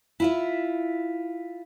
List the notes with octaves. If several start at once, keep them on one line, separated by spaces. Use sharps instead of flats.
E4 F4 E5